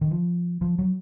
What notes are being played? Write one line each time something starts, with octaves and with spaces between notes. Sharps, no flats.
D#3
F3
F3
F#3